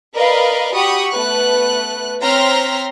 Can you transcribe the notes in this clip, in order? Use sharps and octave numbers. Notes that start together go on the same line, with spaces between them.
A#4 B4 D5 D#5 F5 B5
F#4 G4 B5 C#6 D#6
A3 B3 B4 F#6
C4 C#5 A#5 C6 F6 B6